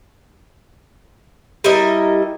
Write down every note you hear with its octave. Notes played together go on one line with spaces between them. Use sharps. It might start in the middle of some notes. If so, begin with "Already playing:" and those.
G3 E4 A#4 D#5